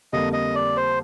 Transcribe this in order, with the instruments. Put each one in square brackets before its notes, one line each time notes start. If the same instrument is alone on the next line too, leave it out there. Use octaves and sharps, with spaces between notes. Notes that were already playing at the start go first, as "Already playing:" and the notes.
[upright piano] F2 D3 G3 A#3 [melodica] D#5
[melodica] D#5
D5
C5